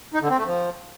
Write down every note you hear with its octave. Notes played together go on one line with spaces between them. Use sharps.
D#4
D3
C4
A3
F3